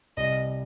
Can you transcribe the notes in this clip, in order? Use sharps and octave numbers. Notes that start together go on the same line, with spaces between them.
C2 D#5